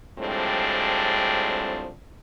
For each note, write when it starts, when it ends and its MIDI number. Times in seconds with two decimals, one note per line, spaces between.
0.19 1.91 45
0.19 1.91 53
0.19 1.91 55
0.19 1.91 56
0.19 1.91 60
0.19 1.91 62